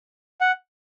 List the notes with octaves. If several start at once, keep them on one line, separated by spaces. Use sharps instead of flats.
F#5